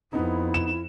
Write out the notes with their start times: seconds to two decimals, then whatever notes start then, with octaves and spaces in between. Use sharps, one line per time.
0.13 F2 B3 D#4 E4
0.54 E7